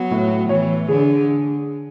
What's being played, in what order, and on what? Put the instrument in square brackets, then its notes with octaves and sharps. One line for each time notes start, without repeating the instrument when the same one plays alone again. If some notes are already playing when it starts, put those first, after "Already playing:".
Already playing: [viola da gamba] F#3 [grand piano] B3
[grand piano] A2
[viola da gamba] E3 [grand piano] C#5
[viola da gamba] D3 [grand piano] G#4